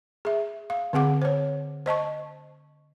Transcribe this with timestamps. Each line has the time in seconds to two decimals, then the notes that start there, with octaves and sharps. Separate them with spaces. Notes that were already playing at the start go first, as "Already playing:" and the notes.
0.25 G#4 E5
0.70 F5
0.93 D3 C4 G#4 F#5 D6
1.22 C5 C#5
1.86 C5 D#5 A5 C#6